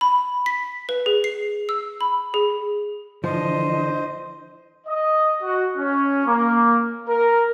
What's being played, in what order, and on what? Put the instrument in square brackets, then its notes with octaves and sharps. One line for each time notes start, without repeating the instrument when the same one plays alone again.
[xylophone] B5
B6
B4
G#4
C7
E6
B5
G#4
[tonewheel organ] D3 E3 D4 [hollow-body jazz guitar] F3 [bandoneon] C5 [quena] D#5
[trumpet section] D#5
F#4
C#4
A#3
A#4